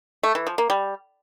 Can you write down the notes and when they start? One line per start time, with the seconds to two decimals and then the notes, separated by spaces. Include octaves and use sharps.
0.23 A3
0.35 E3
0.47 F3
0.58 A#3
0.70 G3